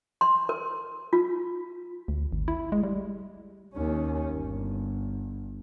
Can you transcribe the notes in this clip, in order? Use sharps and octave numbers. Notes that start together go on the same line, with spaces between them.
C6
A#4
F4
D2
G#1
E4
G#3
G3
D#2 C#4
G1